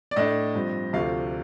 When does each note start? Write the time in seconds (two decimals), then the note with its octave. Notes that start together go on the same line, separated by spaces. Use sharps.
0.11 D5
0.16 A2 A3 D4 D#5
0.55 G2 F3 C4
0.93 D2 C3 F3 A3 F5